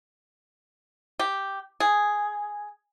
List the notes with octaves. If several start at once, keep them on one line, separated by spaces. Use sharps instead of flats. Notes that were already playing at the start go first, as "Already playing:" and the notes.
G4
G#4